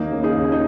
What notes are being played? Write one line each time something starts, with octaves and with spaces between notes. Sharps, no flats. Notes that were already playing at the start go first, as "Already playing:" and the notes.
Already playing: D#2 A#3 D#4
C#3
D#4 G#4
D#2
D#4